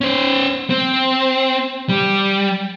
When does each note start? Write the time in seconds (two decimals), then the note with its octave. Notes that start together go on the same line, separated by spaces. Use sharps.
0.01 C#4 C5
0.70 C4
1.89 G3